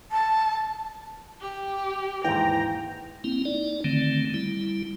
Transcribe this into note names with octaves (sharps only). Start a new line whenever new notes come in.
A5
G4
D#2 G#2 E3 G5 A#5
A#3 C4 E4
D#4 D5
D3 D#3 A3 C4
G3 E4